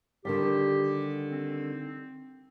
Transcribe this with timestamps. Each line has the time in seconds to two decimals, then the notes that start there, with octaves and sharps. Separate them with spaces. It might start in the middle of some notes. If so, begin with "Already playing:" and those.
0.25 D3 D#3 G3 G4
1.30 C4